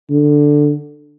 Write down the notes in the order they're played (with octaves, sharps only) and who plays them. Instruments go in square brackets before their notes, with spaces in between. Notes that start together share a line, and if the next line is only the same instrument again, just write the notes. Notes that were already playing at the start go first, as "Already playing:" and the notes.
[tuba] D3